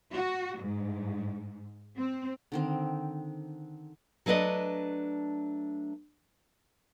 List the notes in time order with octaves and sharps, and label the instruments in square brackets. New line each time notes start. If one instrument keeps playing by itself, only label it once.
[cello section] F#4
G#2
C4
[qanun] D3 D#3 C4
[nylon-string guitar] F#3 A3 D4 B4 D5 D#5